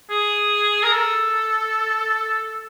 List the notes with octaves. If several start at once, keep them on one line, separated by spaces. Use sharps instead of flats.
G#4
A#4
A4